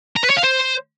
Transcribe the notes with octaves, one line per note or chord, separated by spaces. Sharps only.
A#5
B4
C#5
F5
C5